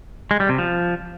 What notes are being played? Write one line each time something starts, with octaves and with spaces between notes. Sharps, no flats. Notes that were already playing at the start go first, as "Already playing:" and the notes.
G#3
G3
C3
F3